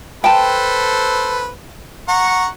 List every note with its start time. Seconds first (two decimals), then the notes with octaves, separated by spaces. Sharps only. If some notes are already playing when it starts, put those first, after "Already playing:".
0.24 A4 B4 C5 G5 A5
2.08 F#5 A#5 C#6